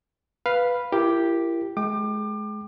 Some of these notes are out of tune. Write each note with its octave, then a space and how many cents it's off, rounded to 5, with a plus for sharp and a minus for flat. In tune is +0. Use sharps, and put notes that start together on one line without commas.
B4 +0 F5 +0
E4 +30 G4 +0 A#4 +0
G#3 +25 G5 -10 D6 +30